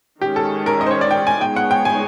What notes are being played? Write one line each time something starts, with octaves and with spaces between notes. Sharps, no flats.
D#3 G#3 C#4 G4
A4
A#4
D#5
C5
C#5
D5
G5
G#5
G#3 B3 D#4 G#4 C#5 G5
F#5
G5
G#5